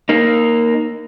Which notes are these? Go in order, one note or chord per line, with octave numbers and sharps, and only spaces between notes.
A#3 D#4